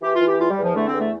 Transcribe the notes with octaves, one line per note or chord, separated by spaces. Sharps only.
E3 G4
F4
E3
G4
E2 F4
G3
E2
F3
D3 A3
C4
E2
A3